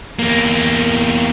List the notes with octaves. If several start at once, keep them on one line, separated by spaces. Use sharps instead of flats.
E2 A#3